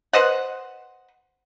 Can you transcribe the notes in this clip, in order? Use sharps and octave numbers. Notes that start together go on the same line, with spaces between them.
B4 C5 D#5 F#5